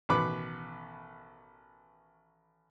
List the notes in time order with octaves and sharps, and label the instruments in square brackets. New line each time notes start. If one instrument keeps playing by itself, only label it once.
[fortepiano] A1 B2 D#3 B4 B5 D6